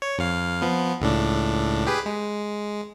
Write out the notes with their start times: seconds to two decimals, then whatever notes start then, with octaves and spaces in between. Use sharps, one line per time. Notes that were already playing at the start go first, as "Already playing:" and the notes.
0.02 C#5
0.18 F2 F5
0.62 F3 B3
1.01 C#2 A2 D4
1.87 G4 G#4 B4
2.06 G#3